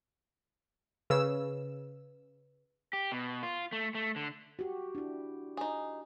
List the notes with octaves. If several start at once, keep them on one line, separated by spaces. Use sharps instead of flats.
C#3 B4 E6
G4
B2
F4
A3
A3
D3
F#4 G4
D4 E4
D#4 G#4